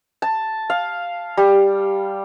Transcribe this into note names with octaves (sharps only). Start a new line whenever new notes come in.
A5
F5
G3